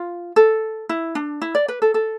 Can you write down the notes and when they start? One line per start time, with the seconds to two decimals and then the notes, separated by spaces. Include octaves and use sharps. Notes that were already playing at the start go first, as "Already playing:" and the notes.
Already playing: F4
0.36 A4
0.89 E4
1.15 D4
1.42 E4
1.55 D5
1.68 B4
1.82 A4
1.94 A4